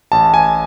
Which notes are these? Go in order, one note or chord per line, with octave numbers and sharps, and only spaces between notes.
A1 A5
G#5